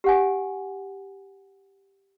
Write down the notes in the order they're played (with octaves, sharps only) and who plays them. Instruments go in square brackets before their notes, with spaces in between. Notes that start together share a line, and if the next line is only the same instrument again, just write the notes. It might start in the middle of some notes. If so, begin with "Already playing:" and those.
[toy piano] G4 F#5 G#5